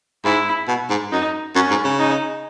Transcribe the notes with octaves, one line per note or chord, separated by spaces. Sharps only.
G#2 E4
B2
G#2
F#2 D#4
F#2 C#4
G#2
C#3
D#4